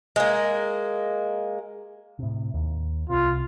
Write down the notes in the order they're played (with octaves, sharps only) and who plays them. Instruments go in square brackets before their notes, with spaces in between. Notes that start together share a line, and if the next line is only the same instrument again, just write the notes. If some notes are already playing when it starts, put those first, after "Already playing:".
[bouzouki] G#3 A#3
[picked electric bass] A2 C3
D#2
[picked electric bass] C2 C3 [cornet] F4